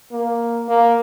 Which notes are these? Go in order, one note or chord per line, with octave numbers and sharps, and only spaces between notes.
A#3
A#3